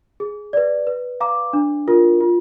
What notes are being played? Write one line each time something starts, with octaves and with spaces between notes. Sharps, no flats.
G#4
B4 D5
B4
F5 A#5 D6
D4
F4 A#4
F4